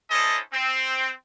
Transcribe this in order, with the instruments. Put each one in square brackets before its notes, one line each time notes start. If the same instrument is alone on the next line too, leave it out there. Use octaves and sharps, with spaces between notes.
[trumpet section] C#4 D4 E4 A4 C5 D#5
C4